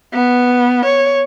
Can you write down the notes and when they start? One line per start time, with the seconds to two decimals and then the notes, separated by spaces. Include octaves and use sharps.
0.13 B3
0.86 C#5